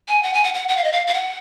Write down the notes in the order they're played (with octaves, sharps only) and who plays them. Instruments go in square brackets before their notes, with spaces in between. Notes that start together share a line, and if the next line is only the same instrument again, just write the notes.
[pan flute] G#5
F#5
G#5
F#5
F#5
F#5
F5
D#5
F5
F5
F#5